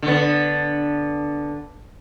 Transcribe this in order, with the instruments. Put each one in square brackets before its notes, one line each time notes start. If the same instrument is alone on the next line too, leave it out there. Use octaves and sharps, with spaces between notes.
[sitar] D3 B3